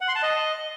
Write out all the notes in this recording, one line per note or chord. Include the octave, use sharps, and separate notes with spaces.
F#5
C6
A5
D#5